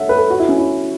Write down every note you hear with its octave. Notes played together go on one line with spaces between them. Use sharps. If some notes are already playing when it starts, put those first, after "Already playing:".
Already playing: A4 C#5 E5 F#5
B4
A4
F#4
E4
C#4
E4